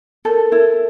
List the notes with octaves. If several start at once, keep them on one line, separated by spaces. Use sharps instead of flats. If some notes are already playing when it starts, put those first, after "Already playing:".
A4 A#4
E4 A#4